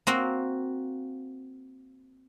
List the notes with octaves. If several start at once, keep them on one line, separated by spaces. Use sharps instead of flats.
A#3 C4 F#4